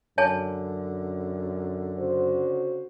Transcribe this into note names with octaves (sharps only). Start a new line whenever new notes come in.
F#2 D3 C#5 G#5 A5
C#3 F#4 C5